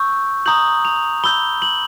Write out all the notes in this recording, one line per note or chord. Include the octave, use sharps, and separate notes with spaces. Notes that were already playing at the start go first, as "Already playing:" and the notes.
Already playing: C#6 E6 G6
A#5 D#6 G6 F#7
F7
B5 E6 G6 G7
F#7